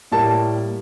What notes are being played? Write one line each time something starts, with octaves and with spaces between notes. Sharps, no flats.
A2 G3 A#3 A5